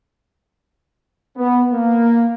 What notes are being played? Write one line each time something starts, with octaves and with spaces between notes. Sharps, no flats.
B3
A#3